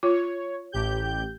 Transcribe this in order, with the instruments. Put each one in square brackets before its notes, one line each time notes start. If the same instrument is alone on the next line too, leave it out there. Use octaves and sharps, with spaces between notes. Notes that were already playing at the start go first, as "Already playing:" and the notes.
[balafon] F4 [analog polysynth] C#5
[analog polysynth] A1 G4 G6